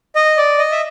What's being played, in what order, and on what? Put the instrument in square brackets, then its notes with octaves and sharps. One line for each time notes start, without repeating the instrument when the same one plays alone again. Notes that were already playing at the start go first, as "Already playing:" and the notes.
[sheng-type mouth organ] D#5
D5
D#5
E5